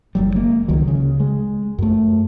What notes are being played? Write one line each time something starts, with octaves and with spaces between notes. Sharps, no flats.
F#1 F#3 G3
G#3 A#3
C#2 D#3 F#3
C#3
G#3
F#2 A3